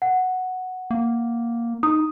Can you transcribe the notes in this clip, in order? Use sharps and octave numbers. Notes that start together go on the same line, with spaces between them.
F#5
A#3
D#4 D#6